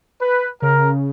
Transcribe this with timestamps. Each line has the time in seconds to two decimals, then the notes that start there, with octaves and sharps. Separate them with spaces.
0.22 B4
0.62 C#3 A#4